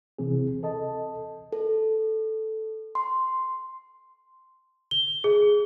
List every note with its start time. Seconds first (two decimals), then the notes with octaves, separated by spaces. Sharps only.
0.19 C3 E3 C4 G#4
0.63 A4 D#5 A5
1.53 A4
2.95 C6
4.91 G7
5.24 G#4